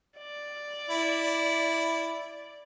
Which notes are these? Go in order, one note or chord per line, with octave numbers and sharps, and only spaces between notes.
D5
E4